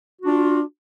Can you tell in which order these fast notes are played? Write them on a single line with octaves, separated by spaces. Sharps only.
F#4 D4 F4